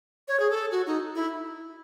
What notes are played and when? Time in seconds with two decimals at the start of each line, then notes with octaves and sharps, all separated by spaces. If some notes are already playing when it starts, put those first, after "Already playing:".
0.28 C#5
0.40 G#4
0.50 A4
0.71 F#4
0.87 D#4
1.15 E4